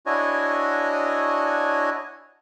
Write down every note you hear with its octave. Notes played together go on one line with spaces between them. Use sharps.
D4 E4 F#4 C#5 D#5 G#5